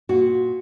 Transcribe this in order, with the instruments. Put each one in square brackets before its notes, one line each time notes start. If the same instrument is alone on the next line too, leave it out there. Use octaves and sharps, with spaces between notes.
[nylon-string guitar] A#2 F#4